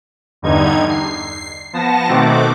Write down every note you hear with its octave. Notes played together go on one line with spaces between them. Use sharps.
E2 G2 D3 G3 D#4 G#6
C7
F3 B3 A5 A#6
B2 D#3 A3 C4 F#4 D6